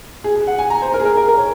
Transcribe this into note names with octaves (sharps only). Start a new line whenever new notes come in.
G#4
G#4
F#5
G#5
A#5
C5
A#4
G#4
A#4
A#4
A#4
C#5